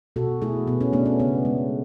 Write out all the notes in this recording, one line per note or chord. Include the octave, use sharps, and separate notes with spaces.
B2 F#4 A4
A3 E4 G#4
B2 B3
C#4
A3 B3 D4
C#4
C#3 B3
G#3